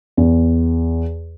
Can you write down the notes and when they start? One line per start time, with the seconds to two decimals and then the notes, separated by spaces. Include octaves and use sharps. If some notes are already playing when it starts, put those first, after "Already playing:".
0.17 E2